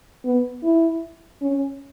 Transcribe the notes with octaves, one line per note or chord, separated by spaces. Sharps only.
B3
E4
C#4